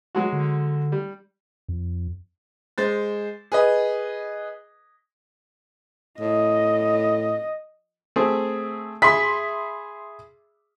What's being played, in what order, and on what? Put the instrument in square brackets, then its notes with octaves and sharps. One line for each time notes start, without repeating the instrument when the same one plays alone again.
[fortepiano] F#3 G#3 F#4
[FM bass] D3
[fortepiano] G3
[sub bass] F2
[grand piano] G#3 C5 A6
G#4 B4 D#5
[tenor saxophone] A2 [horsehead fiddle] D#5
[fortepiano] A3 C4 G#4
[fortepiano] G#4 E5 B5 [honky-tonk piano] C6 B6